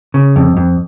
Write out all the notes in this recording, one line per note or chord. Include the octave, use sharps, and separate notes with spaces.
C#3
F2
F2